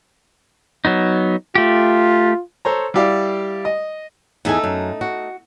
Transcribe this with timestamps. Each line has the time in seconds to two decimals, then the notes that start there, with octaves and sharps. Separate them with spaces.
0.85 F#3 B3 D#4
1.55 A3 F4 G4
2.65 A4 C5 C#5 A#5
2.94 G3 E4 G4 D5 F5
3.65 D#5
4.45 E2 A3 D#4 G#4 G#5
4.64 F#2
5.01 F#4